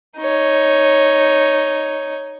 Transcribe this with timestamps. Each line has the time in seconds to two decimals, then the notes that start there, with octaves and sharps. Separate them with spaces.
0.18 D#4 C#5